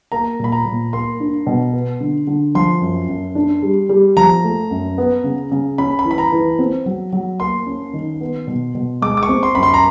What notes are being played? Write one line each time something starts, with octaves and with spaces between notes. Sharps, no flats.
A#3 A#5
A#2 B5
A#5
A#2
A#3 C6
D4
B2
B3
D3
D3
F3 C6
F#2
F#2
D4
G3
G3
F3 A#5
A3
F#2
B3
C#3
C#3
C#4 B5
B5
E3
B5
A#5
E3
C4
F#3
F#3
A#3 C6
C#4
D#3
B3
B2
B2
G#3 D6
D6
C#6
C4
C6
F#2 B5
C6
A#5